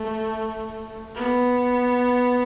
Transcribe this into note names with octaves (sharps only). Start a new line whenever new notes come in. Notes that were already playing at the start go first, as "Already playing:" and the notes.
Already playing: A3
B3